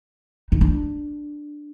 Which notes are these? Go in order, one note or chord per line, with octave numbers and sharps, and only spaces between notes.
D#4
D4